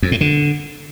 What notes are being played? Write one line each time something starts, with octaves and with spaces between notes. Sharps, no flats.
F2
A2
D3